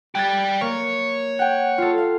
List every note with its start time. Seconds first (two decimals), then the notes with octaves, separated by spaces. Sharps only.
0.15 G3 G4 F#6 G#6 A6
0.61 A#3 C#5
1.39 F#5 G5
1.78 F4 A4
1.98 F5